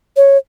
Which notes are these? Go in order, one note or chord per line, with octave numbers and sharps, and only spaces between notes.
C#5